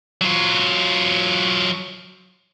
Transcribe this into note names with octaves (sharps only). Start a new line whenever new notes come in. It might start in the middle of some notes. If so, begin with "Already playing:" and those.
F#3 F4